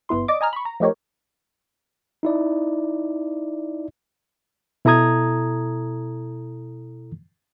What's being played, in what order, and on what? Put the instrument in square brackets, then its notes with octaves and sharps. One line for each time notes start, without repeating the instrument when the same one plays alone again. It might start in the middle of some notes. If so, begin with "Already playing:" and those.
[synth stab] G1 B3 E4 C6
D5 D#5 D6
D#5 G#5 A#5 F6
B5 C#6
A#5
F3 A3 D#4 G4 A#4 C#5
[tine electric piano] D#4 E4 D5
[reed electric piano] B2 E4 A4 A#5 D#6 G#6